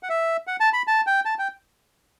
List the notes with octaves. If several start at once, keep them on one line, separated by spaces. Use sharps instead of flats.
F#5
E5
F#5
A5
B5
A5
G5
A5
G5